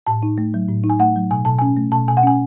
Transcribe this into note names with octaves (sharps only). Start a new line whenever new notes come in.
A2 A5
D#4
A3
F#3
A2
D#4
G#5
A3 F#5
F#3
B2 G#5
B2 A5
C#4 G#5
A3
B2 A5
B2 G#5
F#5
C#4 G#5